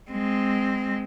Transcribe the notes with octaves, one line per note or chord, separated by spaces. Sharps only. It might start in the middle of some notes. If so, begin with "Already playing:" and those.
G#3 C4